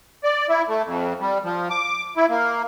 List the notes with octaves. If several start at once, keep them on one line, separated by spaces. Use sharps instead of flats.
D5
E4
A3
F2
G3
F3
D6
E4
A#3